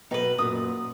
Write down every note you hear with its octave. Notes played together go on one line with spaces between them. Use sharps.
B2 F#3 B3 D#4 B4
F#2 A#2 D#6